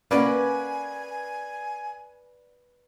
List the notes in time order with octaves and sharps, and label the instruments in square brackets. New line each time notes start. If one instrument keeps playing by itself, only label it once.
[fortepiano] A#3 C#4 [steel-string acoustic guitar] B4 [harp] D5 F#5 [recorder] G#5